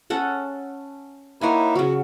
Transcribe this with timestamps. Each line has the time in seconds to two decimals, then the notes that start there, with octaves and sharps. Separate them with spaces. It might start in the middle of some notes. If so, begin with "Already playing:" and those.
0.10 C#4 A4 F#5
1.41 A#3 D#4 E4 C#5 F#5 G#5
1.75 C#3 F#3 F#4